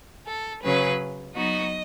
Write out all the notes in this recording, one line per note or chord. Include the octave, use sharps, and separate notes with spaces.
A4
C#3 F#3 C#4 G#4 B4
F#3 B3 D#4 F#4 D#5